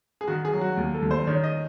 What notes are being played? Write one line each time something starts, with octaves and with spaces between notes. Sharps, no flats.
G#4
D#3 F#4
G#4
F#3
F#4
D#2
A4
D#2
C5
D#3 C#5
D#5